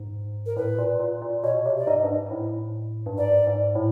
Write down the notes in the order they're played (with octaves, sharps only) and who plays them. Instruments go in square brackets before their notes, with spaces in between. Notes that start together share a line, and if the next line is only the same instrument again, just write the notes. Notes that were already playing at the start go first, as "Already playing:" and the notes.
Already playing: [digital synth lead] G#2
[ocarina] A#4
[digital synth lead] A2 [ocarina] B4
[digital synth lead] A#2
A#2
A#2
[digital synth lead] B2 [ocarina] C#5
[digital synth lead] C3 [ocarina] C#5
[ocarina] D5
[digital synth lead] G#2 [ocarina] D#5
[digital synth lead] G2
G#2
G#2
A2
G2
[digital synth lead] G#2 [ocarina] D5
[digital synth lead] G#2
A2